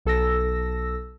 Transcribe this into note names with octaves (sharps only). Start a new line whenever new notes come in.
B1 A4 E6 A#6